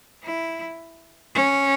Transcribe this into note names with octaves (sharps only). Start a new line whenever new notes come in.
E4
C#4